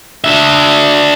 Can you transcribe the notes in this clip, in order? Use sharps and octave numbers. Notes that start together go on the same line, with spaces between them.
D4 E5